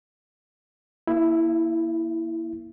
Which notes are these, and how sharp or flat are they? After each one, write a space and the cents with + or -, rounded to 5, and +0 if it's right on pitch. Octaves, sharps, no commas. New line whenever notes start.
A#3 +15 E4 +0 E5 +45